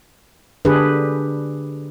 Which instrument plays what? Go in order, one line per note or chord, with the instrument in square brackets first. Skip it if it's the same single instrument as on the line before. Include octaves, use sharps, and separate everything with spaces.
[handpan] D3 D4 G4 G#4 B4